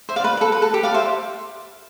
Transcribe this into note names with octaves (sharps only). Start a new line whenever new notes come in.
C5 E5
D5 F5
B4
B4
A4
B4
A4
G4
D5 F5
C5 E5